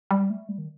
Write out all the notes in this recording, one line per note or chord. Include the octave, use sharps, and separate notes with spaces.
G3
A3
G3
D#3